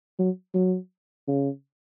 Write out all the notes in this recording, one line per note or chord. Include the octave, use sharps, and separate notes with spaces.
F#3
F#3
C#3